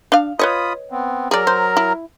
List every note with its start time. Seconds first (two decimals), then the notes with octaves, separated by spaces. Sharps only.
0.12 D4 F5
0.39 F4 B4 C#5 D#5 B5 D#6
0.91 B3 C4
1.31 F#3 G#4 A#4 D5 A#5
1.47 C5
1.77 E4